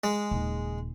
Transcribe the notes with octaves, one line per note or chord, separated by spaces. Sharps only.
G#3
D#1 C#3